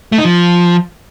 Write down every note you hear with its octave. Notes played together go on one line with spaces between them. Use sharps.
A3
D#4
F3